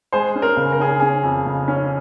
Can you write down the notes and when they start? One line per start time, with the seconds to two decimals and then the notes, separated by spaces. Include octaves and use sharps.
0.12 G#3 G#4 C5
0.35 C#4
0.42 A#4
0.57 C#3
0.72 A#4
0.79 C#4 G#4
1.00 C#4 G#4
1.23 F2
1.46 C#3
1.68 C#4